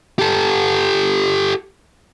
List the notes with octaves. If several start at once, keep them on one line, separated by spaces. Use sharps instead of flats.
G4 A4